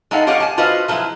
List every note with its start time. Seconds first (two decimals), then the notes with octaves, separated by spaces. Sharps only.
0.11 G#3 D#4 E4 A4 F5 F#5
0.27 F4 G4 C#5 D#5 F5 F#5
0.40 G#5 A5
0.58 F4 F#4 B4 C5 D#5 F5
0.88 F3 F#3 G#3 E4